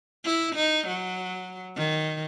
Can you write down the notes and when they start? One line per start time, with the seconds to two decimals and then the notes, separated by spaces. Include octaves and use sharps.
0.25 E4
0.55 D#4
0.87 F#3
1.76 D#3